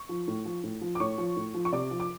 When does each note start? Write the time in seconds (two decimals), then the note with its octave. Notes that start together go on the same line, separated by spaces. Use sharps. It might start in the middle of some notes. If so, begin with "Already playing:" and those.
Already playing: C#6
0.09 F3
0.28 A2
0.45 F3
0.64 A2
0.81 F3
0.95 D6
1.00 A2 C#5 C#6
1.18 F3
1.36 A2
1.54 F3
1.65 C#6
1.73 C3 D5 D6
1.91 F3
2.00 D6